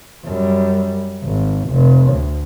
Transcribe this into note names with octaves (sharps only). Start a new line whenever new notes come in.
F#2 G3
G#1
F1
D2